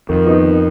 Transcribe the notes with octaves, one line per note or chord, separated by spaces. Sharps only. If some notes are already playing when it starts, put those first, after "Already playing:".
F2 D#3
B3 D#4
D#3